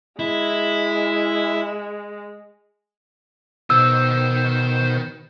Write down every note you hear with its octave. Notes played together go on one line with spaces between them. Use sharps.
G#3 E4
B2 D#3 C5 E6